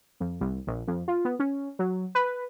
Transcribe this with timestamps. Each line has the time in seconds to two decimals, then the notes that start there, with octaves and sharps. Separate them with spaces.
0.20 F2
0.41 C2
0.67 A#1
0.87 F2
1.08 F4
1.25 B3
1.39 C#4
1.79 F#3
2.15 B4